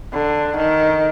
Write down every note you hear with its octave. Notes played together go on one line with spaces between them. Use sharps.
D3
D#3